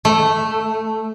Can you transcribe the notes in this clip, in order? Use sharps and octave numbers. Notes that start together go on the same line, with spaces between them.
A3